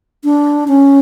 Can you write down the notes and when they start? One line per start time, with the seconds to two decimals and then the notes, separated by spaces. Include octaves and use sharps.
0.24 D4
0.68 C#4